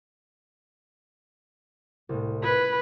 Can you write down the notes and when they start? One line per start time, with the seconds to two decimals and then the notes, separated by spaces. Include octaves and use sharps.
2.09 C2 A2
2.43 B4 B5 G#6 C#7